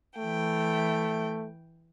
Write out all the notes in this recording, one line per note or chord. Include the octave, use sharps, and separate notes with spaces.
E3 A3 G5